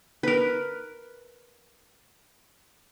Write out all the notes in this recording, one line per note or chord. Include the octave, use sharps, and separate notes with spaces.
A#4 B4